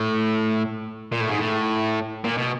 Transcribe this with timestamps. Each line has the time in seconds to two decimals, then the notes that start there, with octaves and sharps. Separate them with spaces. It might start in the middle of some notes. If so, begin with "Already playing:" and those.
Already playing: A2
1.12 A#2
1.20 A2
1.30 G#2
1.39 A2
2.24 A#2
2.37 B2